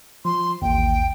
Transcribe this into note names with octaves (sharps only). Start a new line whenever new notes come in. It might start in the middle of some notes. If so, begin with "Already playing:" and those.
F3 C6
A1 D#2 G5